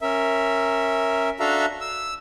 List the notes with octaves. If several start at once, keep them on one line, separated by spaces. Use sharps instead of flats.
C#4 A#4 E5
D4 F#4 A4 E5 F5 A#5
E6